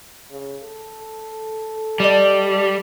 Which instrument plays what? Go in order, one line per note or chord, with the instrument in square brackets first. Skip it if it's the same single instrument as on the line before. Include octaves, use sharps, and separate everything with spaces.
[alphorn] C#3
A4
[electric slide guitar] G3 [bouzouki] D5 D#5 A5